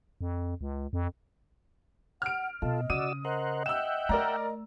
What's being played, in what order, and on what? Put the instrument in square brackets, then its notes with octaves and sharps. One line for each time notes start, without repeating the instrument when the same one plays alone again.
[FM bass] F2
C#2
F2
[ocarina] F#5 [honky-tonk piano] F6 D7
[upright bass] B2 [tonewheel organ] F4 A4 [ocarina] D#5
[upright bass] C#3 [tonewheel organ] F#4 D5 E6 [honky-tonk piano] D#6 D#7
[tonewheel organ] A#4 C5 F#5 [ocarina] D#5
[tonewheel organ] E5 F#5 G5 [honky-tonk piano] E6 E7
[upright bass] A3 [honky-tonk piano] A#4 D5 A#5